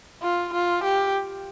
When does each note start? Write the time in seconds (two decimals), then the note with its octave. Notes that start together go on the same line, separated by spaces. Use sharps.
0.22 F4
0.53 F4
0.83 G4